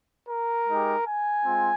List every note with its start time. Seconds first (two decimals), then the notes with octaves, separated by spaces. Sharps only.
0.29 A#4
0.68 G#3 D#4 G4
1.07 G#5
1.45 G#3 C4 F4